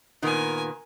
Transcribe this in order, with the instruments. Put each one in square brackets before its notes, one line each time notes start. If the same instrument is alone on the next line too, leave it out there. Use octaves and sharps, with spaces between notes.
[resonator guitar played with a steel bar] A#2 D#3 B3 [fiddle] A#4 G#5